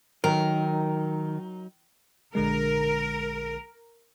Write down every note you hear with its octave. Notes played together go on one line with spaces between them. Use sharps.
D#3 F#3 D#4 A#4
A#1 D3 G#3 A#4